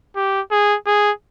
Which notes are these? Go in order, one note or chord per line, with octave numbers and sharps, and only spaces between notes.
G4
G#4
G#4